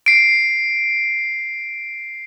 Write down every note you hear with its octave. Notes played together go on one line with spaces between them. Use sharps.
C7 D7